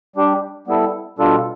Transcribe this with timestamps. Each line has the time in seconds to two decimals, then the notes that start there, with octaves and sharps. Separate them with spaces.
0.16 G3 D4 G4
0.67 G3 B3 E4 A4
1.19 B2 G3 D4 F4 A4